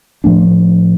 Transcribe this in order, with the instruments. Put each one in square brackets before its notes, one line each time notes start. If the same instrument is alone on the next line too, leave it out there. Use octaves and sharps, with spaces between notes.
[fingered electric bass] A2 F3 A3 D4